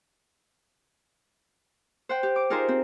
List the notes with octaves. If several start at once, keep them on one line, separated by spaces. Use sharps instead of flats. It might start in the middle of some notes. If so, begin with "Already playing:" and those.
C5 F#5 G5
G4
D6
D#4 F4 G#4 A#4 C5
C4